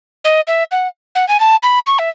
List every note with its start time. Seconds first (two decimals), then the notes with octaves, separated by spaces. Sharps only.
0.25 D#5
0.48 E5
0.71 F#5
1.15 F#5
1.28 G#5
1.40 A5
1.63 B5
1.87 C#6
1.99 E5